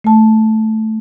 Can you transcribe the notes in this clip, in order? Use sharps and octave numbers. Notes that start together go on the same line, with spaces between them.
A3 A5